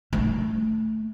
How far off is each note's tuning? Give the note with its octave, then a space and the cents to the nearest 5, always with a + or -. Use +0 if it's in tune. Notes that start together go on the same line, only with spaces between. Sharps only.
A3 +0